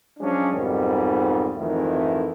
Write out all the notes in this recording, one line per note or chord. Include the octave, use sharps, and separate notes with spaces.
F3 F#3 G#3 C#4 D4
B1 F2 G#2 D#3 G3 B3
G#1 F2 D#3 E3 A3 E4